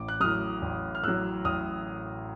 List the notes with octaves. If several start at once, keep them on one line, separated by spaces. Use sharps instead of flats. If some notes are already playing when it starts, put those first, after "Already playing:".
Already playing: A1 D6
F#6
A2 F#3 D#6 F6
A1
F6
A2 F#3 E6 F#6
A1 D#6 F6